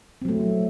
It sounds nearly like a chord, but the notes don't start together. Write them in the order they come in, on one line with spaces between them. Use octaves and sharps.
C4 F#3 A3